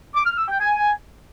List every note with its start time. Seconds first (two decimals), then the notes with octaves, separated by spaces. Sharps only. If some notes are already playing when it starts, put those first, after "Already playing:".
0.14 D6
0.26 F6
0.37 E6
0.48 G5
0.60 G#5